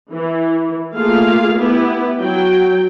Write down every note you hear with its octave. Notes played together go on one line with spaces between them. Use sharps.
E3
A3 A#3 F4 G#4 F5
B3 E4 G4 B4
F#3 G5